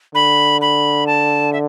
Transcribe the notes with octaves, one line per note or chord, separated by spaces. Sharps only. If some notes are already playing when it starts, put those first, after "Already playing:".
D3 B5
B5
A5
E5